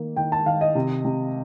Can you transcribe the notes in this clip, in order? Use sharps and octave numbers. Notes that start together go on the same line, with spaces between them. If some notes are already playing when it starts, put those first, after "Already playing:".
Already playing: D#3 A#3
D#3 G5
A5
D#3 F5
D#5
C3
C3